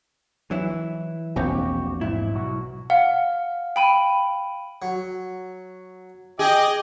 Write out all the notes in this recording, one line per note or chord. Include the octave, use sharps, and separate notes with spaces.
E3 F#3 E4
E1 A#1 C4 F#4 G4
G#2 E4
B1 F#4
F5 F#5
G5 B5 D#7
F#3
G#4 D#5 G5 D6